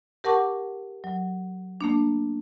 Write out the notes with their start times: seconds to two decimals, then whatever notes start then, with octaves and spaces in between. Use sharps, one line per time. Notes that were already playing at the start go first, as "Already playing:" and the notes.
0.24 G4 A#4 F#5 A5 C#6 D6
1.04 F#3
1.81 A3 A#3 D4